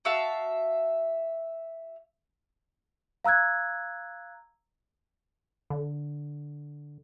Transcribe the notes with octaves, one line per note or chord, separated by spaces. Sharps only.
F#4 E5 F5 A5
F5 A#5 E6 F#6 G#6
D3